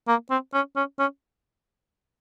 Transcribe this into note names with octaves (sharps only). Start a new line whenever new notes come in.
A#3
C4
C#4
C#4
C#4